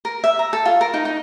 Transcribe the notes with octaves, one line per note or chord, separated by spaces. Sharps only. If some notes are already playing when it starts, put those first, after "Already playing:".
A#4
E5
A#5
A4
F4
A#4
D#4
D#4